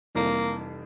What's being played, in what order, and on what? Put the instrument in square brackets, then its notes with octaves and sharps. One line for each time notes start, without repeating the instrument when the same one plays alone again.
[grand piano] F1 F2 E3 G3 [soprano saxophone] A#3